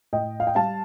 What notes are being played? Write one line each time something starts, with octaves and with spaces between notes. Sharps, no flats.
A2 D#5 G5
F5
G5
G3 F5 A5